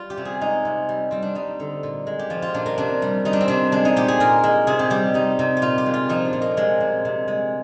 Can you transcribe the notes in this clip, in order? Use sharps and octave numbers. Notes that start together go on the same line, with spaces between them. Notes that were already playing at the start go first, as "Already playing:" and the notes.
Already playing: G3 F4
G4
C3
G#4
G#3 D#4
C3
G3
G3 C4
D4
G3 D#4
D3
A#2
G#3
G4
F3 F4
F4
A#2 D4
A#3
C3 D4
G3
G3 D#4
D4
C4
C3 D4
G#3 D4
D#4
A#2 G4
G#4
A#2 A#4
G#3
C3 G#4
G4
G3 G4
G3 D#4
C3
G4
A#2 F4
G4
G#3
F4
F3 D#4
D4
A#2
A#3
C3 G#3
C3
C3
G#3